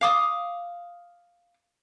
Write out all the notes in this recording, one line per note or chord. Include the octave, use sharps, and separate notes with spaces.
F5 D6 D#6